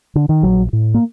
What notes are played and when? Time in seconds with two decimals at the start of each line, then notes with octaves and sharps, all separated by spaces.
0.15 D3
0.29 D#3
0.43 A#1 F#3
0.73 A2
0.94 A#3